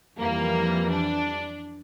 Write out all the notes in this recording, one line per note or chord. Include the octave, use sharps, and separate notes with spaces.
F2 E3 G3 A#3
D4